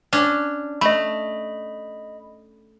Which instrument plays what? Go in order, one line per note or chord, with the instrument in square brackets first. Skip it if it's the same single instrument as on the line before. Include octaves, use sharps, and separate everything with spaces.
[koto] C#4 D4
[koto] A3 [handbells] D#5 B5